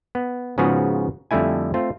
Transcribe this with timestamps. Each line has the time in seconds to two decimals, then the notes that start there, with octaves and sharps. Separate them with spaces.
0.15 B3
0.58 G#2 C#3 F3 B3 F#4 G#4
1.31 F2 D3 G3 A3 E4 G#5
1.74 A3 C4 F4